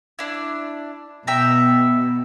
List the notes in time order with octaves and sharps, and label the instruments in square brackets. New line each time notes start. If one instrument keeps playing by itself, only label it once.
[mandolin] D4 E4
[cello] B2 [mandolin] E5 G5 A#5